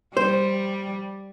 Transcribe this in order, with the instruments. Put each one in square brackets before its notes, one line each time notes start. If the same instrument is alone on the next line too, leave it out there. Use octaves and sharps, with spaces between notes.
[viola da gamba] G3 [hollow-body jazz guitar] C5